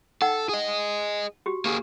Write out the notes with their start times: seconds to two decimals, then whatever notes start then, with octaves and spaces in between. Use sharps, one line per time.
0.22 D#4 A4 F#5 G5
0.49 G#4 D#5
1.46 F#4 G4
1.65 A#3 G4 G#4